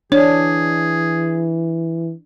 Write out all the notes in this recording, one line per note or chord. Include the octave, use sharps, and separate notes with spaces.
E3 D4 G#4 C#5